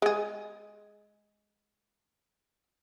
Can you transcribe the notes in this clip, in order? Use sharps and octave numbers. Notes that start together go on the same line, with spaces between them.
G#3 G#4